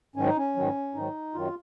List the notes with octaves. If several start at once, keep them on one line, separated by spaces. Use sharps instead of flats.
G#2 D#3 F#3 C#4
D#4
C#4
G#2 D#3 F#3
G#2 D#3 F#3 D#4
F#2 D#3 F#3 F4